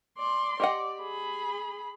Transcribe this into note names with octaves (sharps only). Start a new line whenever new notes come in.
D5 C6
G4 D5 D#5 F#5
G#4 B5